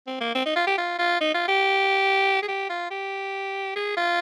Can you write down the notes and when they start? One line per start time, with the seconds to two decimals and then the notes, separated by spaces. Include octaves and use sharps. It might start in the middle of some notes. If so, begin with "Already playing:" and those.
0.07 C4
0.20 A#3
0.35 C4
0.45 D#4
0.56 F4
0.67 G4
0.78 F4
0.98 F4
1.20 D#4
1.34 F4
1.48 G4
2.42 G#4
2.47 G4
2.69 F4
2.91 G4
3.76 G#4
3.97 F4